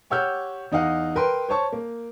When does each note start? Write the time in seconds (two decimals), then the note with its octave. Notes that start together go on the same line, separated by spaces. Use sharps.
0.10 G4 C#5 F#5 E6 F6 G6
0.72 E2 D#4 D#5 F5 F#5
1.16 A#4 B4 G5 C6
1.49 C5 C#5 A5 C#6
1.72 A#3